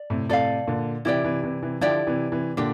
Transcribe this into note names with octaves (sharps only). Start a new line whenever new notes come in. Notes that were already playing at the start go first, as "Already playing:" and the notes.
Already playing: D5
A2 C3
A2 C3 A4 D5 F5
A#2 D3
C3 E3 E4 G4 D5 G5
C3 E3
C3 E3
C3 E3
D3 F3 E4 G4 D5 G5
C3 E3
C3 E3
A#2 D3 D4 G4